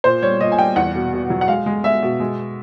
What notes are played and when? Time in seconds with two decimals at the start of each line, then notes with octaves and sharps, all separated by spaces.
0.04 A#2 C5
0.22 G3 C#5
0.41 A#2 D#5
0.52 G#5
0.59 G3 G5
0.76 E2 F#5
0.95 B2
1.13 B2
1.30 F#3
1.41 F#5
1.48 G#3 F5
1.66 G#3
1.84 G#3 E5
2.02 B2
2.20 G#3